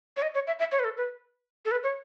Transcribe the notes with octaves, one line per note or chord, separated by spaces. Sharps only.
C#5
D#5
C#5
E5
E5
C#5
B4
A4
B4
A4
B4
C#5